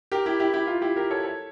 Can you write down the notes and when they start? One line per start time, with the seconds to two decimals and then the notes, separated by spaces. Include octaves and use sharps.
0.12 G4 A#4
0.26 E4 G4
0.40 E4 G4
0.53 E4 G4
0.67 F4
0.81 E4 G4
0.96 G4 A#4
1.11 A4 C#5
1.24 A4 C#5